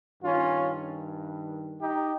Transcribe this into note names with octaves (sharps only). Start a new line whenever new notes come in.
G2 D#3 C#4 F4
D#4 G4